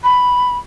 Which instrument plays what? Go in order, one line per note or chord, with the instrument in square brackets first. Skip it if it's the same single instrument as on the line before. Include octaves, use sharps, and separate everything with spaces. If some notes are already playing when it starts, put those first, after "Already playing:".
[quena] B5